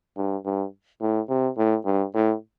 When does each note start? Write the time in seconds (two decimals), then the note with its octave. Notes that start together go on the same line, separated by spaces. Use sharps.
0.17 G2
0.45 G2
1.01 A2
1.29 C3
1.57 A2
1.85 G2
2.14 A2